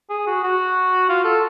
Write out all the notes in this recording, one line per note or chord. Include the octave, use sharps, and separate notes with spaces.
G#4
F#4
F#4
F4
A4